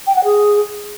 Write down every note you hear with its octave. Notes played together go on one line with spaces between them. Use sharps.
G5
F#5
G#4